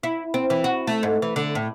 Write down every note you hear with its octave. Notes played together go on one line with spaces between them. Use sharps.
E4
C4
E3
F#4
A3
G#2
E3
D3
A2